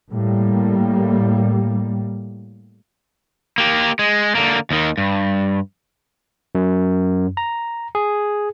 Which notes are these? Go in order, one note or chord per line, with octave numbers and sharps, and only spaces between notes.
A2 G3 A#3
A#3 G4
G#3
D3 A#3
D#2 D#3
G2
F#2
A#5
G#4